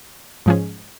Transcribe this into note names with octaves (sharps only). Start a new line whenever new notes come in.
G#2 F3 G#3 C#4 G#4